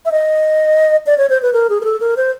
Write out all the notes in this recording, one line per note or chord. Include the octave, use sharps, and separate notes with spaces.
E5
D#5
D5
C#5
C5
B4
A#4
G#4
A#4
A4
A#4
C5